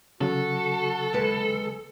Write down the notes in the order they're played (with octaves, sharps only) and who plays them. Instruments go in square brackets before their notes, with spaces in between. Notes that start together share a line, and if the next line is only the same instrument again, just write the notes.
[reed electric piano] C#3 F#3 [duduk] F#4 [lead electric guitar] A4
[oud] D#2 G#3 B4